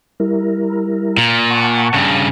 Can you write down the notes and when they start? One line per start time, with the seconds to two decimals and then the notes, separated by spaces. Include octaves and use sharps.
0.20 G3 E4 A#4
1.17 A#2
1.51 F#5 A5 C#6
1.94 G2 C#3